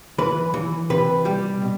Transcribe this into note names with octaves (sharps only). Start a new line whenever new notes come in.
E3 B4
E3
C3 B4
G3 G4
B2